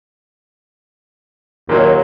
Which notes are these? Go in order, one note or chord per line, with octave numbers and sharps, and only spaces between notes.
D#2 A#2 F#3 A#3